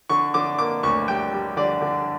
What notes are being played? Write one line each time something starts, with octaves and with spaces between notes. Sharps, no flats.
D3 C#6
D3 D6
A#3 D6
D2 C#6
G3 G5
G3
D3 D5
D3